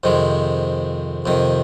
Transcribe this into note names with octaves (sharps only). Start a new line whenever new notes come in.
F2 C3 D#3 G#3
F2 C3 D#3